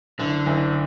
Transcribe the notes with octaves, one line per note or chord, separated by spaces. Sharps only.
F#1 D3
F#1